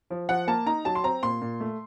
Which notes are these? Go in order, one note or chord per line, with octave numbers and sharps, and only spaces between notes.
F3
F3 F#5
A#3 A5
D#4 A#5
F#3 A5
C6
C4 A#5
A#2 C6
A#2
A3